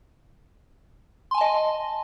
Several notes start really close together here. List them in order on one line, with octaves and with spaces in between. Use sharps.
C6 G#5 A5 D#5